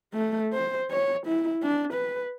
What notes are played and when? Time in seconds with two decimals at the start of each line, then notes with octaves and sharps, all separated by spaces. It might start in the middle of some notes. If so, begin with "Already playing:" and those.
0.14 A3
0.53 C5
0.91 C#5
1.26 E4
1.63 D4
1.94 B4